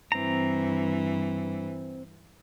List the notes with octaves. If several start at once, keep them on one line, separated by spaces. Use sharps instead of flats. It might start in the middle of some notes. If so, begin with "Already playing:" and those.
G2 E3 C4 A#5